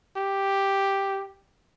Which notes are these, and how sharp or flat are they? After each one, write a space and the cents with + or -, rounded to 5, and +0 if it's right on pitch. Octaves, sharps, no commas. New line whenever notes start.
G4 +0